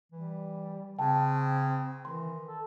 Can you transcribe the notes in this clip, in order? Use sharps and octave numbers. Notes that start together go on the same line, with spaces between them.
E3 G3
C#3 C4 G5 A5
D#3 E3 C6
A4